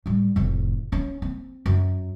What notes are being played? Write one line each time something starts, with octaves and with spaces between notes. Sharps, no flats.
A2 G3
F1 A2
A#3 C#4
C4
F#2